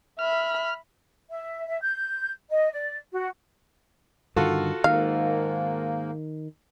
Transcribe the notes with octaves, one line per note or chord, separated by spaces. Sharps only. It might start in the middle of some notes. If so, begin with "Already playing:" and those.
E5 B5 F6
E5
E5
G6
D#5
D5
F#4
G2 D3 D#3 F4 F#4 A4
G#2 D#3 A#3 F5